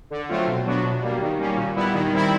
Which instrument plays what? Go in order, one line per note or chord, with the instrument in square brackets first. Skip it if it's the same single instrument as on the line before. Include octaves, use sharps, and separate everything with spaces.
[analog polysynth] D3
F#3 A3 C4 F4
B2
F#3 B3 D4 F#4
B2
G3 A#3
D#3
G3 A#3 C#4
A#2
G3 B3 E4
D#3
G3 C4 E4